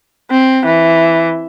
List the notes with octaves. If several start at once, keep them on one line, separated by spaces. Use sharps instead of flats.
C4
E3